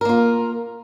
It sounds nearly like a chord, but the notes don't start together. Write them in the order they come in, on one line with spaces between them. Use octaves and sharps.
A#4 A#3 F4